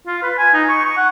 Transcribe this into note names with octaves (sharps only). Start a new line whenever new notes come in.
F4
B4
G#5
D#4
C#6
C#6
F#5